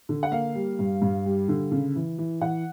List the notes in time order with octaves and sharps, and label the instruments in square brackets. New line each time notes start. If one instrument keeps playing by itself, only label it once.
[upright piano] D3
F#5
A#3 F5
G3
G2
G2
G3
D3
C#3
E3
E3
E3 F#5